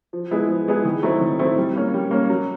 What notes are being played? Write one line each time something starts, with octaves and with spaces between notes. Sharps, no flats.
F3
G#3 B3 E4 G#4
F3
G#3 B3 E4 G#4
D#3
F#3 A3 C4 E4
D#3
F#3 A3 C4 E4
G3
A#3 C#4
G3
A#3 C#4
F#3